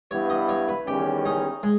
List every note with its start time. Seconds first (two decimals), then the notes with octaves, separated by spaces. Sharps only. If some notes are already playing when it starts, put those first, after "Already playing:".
0.11 G2 G3 B3 E4 C#5
0.30 D#5
0.49 C#5
0.68 B4
0.87 E2 D#3 G3 C#4 G4
1.25 D#4
1.63 G#3